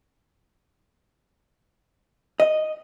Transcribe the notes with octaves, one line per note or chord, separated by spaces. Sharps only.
D#5